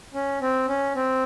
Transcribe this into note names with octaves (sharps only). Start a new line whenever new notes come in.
C#4
C4
C#4
C4